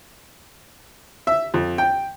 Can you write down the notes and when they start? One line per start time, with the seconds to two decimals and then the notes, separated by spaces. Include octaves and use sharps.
1.27 E5
1.54 F2
1.78 G5